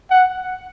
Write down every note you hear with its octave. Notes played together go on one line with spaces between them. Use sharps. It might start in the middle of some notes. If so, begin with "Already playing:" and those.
F#5